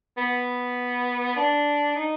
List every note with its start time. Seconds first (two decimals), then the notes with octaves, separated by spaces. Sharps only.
0.17 B3
1.37 D4
1.96 D#4